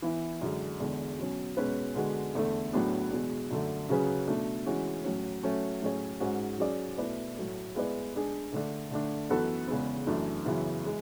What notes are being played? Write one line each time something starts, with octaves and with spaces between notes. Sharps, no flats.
E3 B3 E4
F#2 D3 G#3
E2 D3 G#3
B2 F#3 C#4
B2 G#3 C#4 F#4 B4
D3 G#3 B3 F#4
E2 D3 A3 D4 A4
A2 F#3 B3 D4 G#4
E2 B2 G#3
F#2 D3 A3
C#3 F#3 C#4 G#4 B4
B2 A3 D4
E3 G#3 C#4 F#4
A2 F#3 C#4
F#3 A3 C#4
A2 F#3 C#4 G#4 C#5
G#2 G#3 C#4 F#4 C#5
F#3 C#4 G#4 D5
B2 A3 E4 B4 D5
A2 F#3 A3
G#3 B3 E4 B4 D5
G#3 D4 G#4
D3 A3 D4 A4
D3 A3 D4
F#2 E3 B3 F#4 A4
E2 C#3 G#3 B3
F#2 E3 A3 D4
F#2 C#3 E3 B3
E3 G#3